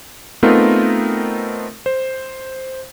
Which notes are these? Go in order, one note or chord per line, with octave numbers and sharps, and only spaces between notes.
A3 B3 C4 D#4 F4 A#4
C5